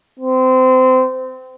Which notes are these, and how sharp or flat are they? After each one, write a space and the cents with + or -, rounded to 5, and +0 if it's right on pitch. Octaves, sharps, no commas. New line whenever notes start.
C4 -25